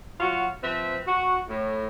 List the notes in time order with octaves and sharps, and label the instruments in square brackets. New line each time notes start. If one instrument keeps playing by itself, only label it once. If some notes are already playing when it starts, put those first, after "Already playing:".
[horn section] F#3 F4 F#4
F3 C4 B4 E5
F#4
A2